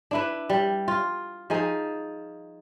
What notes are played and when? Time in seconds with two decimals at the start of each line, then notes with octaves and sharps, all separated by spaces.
0.11 D4 E4 B4
0.50 G3
0.88 F4
1.50 F3 D#4 G#4